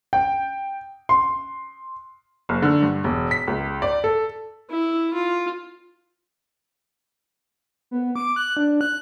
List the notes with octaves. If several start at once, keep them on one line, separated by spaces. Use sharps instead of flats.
G5
C6
F#1
D3
G2
E1
B6
C#2
D5
A4
E4
F4
B3
D6
F#6
D4
F#6